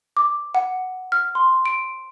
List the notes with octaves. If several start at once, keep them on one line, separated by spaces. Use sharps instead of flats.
D6
F#5
F6
C6
D7